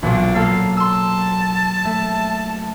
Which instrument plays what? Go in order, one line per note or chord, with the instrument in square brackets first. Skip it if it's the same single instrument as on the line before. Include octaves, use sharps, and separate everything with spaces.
[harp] B1 A#2 F#3 [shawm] D4
[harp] A#3 A4 [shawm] F5
[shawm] A5 [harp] C6 E6
[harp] A3